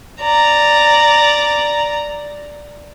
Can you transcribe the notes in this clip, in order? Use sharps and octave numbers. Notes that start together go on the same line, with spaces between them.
D5 A#5